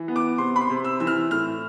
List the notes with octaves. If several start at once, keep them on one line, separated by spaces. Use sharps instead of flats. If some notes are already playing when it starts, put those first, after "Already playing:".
Already playing: E3
B3
D6
C3 C6
B5
C6
C3
E6
E3 E6
F6
A2 F6